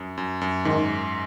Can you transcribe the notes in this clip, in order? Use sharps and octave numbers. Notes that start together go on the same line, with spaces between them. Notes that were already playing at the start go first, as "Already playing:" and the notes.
Already playing: F#2
F#2
F#2
G#2 D#3